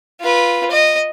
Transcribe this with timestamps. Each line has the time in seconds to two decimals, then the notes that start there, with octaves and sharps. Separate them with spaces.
0.21 F4 B4
0.71 D#5